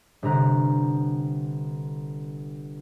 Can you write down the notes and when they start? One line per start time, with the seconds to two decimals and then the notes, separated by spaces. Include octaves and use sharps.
0.22 G1 C3 A#5 F#6